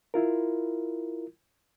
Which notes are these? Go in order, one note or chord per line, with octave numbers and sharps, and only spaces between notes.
E4 F4 A#4